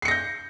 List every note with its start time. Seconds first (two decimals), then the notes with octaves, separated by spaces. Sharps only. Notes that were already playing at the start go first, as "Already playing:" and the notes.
0.02 C7
0.05 C#7
0.08 A#6
0.11 G6